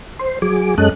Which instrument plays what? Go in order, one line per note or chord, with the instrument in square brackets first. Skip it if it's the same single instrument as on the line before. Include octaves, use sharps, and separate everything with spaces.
[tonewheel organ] C5
F#3 G#4 D6
F#2 G#3 C#4 A4 D#5 F#6